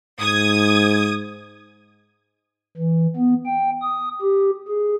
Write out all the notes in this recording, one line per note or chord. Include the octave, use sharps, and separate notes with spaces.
G#2 D#6 G#6
E3
B3
G5
D#6
G4
G#4